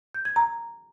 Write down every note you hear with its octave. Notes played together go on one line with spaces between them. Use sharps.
G6
G#6
A#5